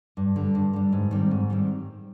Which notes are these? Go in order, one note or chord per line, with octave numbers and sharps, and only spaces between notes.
G2
D3 G3
G2
D3 G3
G#2
D#3 G3 C4
G#2
D#3 G3 C4